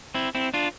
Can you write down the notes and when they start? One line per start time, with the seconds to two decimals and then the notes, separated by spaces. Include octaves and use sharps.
0.14 C4 E4
0.35 C4 E4
0.54 D4 F4